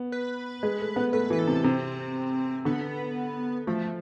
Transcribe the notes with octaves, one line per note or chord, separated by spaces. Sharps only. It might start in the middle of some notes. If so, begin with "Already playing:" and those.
Already playing: B3
B4
G#3
A3
B3
A3 B4
E3 B4
A4
C3
C3 C4
D3 B3
F3 A3